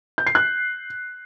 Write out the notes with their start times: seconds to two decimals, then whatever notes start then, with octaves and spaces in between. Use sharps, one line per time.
0.18 G6
0.27 C7
0.35 F#6